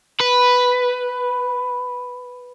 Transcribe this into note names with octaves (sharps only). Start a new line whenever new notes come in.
B4